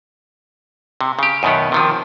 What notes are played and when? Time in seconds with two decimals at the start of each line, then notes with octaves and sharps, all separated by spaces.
1.01 C3
1.19 C#3 G4
1.43 F#2 B2 D#3 B3
1.72 C3 D#3 F3